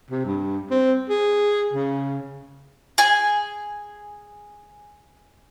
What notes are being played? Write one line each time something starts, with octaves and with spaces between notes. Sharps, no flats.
C3
G2
C4
G#4
C#3
G#4 G#5